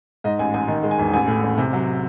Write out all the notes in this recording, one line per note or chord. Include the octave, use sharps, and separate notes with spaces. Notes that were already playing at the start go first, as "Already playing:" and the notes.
G#2 D#5
A1 G#5
A1 G#5
D#3
G#3
G#5
E1
A1 G#5
A2
A1
C3
F#3